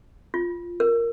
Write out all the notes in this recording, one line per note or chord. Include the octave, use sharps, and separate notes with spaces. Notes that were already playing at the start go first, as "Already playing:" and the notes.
F4
A#4